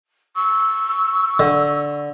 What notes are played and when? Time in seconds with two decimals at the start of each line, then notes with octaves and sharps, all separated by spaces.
0.36 C#6 E6
1.39 D3